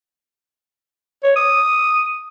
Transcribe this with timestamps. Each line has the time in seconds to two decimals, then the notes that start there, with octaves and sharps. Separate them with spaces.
1.23 C#5
1.36 D#6